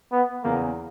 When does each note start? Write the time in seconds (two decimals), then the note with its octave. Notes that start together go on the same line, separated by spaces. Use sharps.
0.12 B3
0.44 E2 C#3 E3 A#3